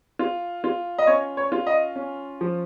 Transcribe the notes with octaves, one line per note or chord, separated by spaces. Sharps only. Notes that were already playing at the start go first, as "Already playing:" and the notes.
F4
F4
D#5
C#4 C#5
C#5
F4
D#5
C#4
F3